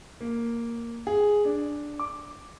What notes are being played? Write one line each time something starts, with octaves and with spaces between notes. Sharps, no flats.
A#3
G#4
D4
D6